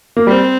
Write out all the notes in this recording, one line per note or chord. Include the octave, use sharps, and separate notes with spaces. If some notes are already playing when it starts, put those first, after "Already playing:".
A#3
G3 C4